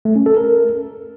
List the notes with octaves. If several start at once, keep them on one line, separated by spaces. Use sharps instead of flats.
A3
C#4
A4
A#4